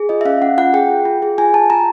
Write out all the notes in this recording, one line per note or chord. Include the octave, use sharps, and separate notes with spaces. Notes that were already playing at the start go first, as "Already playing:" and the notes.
Already playing: G#4
F4 D#5
E5
C#4 F5
C#4 F#5
F4 F#5
G#4 G5
F4
F4
G#4
F4 G#5
F4 A5
F4 A#5